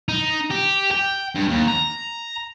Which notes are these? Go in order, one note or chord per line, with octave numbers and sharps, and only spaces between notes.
D#4
G4
G5
G2
D#2
A#5